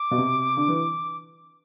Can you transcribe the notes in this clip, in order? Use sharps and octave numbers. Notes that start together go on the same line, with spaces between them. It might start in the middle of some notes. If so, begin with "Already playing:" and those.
Already playing: D6
B2
C3
D3
E3